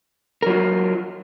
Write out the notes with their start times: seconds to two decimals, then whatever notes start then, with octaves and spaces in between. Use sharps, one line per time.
0.42 A#4
0.46 F#3
0.50 F4